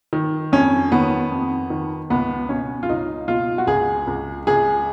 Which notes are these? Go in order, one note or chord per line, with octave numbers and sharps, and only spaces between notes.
D#3
F2 C#4
D#3 B3
F2
D#3
C#2 B3
B2 C#4
F4
C#2 D#4
B2 F4
F#4
C#2 G#4
C#2
C#2 G#4